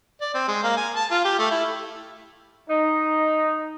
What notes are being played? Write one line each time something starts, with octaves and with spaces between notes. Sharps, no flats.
D5
C4
G#3
A#3
G#5
A5
F4
G4
A3
E4
D#4